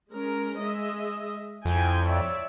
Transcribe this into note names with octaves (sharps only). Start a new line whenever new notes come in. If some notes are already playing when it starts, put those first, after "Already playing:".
G#3 C#4 A#4
G#3 D#5 E5
F2 E4 G5 G#5
C#5 D5 E5